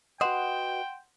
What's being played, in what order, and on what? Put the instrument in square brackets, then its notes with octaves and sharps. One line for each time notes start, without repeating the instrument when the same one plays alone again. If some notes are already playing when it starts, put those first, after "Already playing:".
[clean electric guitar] F#4 B4 D#5 [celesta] F#5 C6 E7 [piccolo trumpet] G5